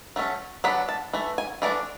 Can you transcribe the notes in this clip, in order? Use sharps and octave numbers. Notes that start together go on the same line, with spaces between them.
F#3 A3 C#4
F#3 B3 D4 B5
A5
E3 A3
G#5
E3 A3 D4 D5